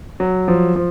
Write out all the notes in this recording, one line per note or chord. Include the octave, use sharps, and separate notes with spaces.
F#3
F3
F3